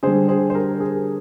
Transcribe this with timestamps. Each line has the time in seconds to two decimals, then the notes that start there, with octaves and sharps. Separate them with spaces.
0.03 D3 G3 G#4 C5
0.29 G#4 C5
0.50 C5
0.54 G4 A#4
0.80 G#4